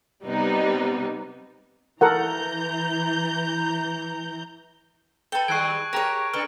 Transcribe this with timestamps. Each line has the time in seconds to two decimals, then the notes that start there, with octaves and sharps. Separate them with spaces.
0.25 C3 G3 B3 D#4
2.01 E3 A4 A#4 F#5 A#5 G6
5.32 A4 B4 G5 A5 G7
5.48 D#3 G3 G#3 C#6 F#6 G#6 C7 D7
5.93 G4 G#4 A#4 C#5 A#5 A#6
6.33 C3 D4 A4 B4 F6